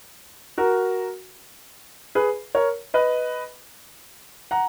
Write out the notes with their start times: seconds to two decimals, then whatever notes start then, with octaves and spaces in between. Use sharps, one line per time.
0.58 F#4 A#4
2.15 G#4 B4
2.55 A#4 C#5
2.94 B4 D#5
4.51 F#5 A#5